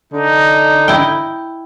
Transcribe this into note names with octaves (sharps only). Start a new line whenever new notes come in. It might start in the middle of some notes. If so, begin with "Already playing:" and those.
D3 D#4
E4 G5